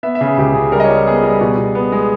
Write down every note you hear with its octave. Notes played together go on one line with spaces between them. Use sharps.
B3 E5
E5
C#3
G#4
C#2 G4
C#3 G#4
G3 A#4
D#5
C#5
G3
A#4
B3 G#4
G3
B2
B2
B3
G#3